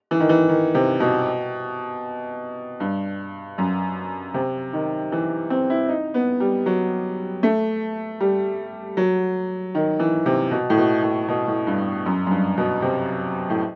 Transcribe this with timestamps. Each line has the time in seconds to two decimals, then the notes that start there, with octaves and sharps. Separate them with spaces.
0.11 E3
0.20 D#3
0.29 E3
0.49 D#3
0.75 C3
1.00 B2
2.80 G2
3.58 F#2
4.34 C3
4.73 D#3
5.12 E3
5.50 C4
5.70 E4
5.89 D#4
6.14 B3
6.40 G3
6.66 F#3
7.43 A3
8.20 G3
8.97 F#3
9.75 D#3
10.00 E3
10.26 C3
10.51 B2
10.70 A2
10.77 B2
11.03 A2
11.28 B2
11.48 A2
11.67 G2
12.06 F#2
12.26 F#2
12.31 G2
12.58 B2
12.82 C3
13.50 A2